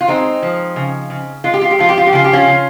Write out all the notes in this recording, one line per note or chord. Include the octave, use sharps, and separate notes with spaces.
F4
G#3 C4 D#4
F3
C#3
C#3
G#3 F4
G4
F4
G4
F3 F4
G4
F4
G4
C#3 F4
G4
C#4 F4
C#3